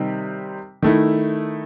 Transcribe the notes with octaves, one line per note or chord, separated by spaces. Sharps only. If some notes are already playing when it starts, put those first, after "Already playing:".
Already playing: C3 D#3 G3 C4 D#4
D#3 A3 E4